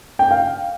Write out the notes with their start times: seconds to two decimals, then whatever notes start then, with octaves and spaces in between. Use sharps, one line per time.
0.19 G5
0.31 F5